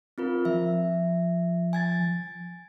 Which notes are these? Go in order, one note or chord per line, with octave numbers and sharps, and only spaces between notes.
C4 F4 A#4
F3 E5
G#5 G#6 A6